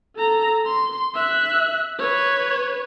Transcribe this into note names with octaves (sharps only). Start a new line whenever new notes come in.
A4 A#5
C6
E5 F#6
B4 C#5